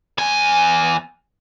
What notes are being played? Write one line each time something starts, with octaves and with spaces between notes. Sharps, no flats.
E2 G#5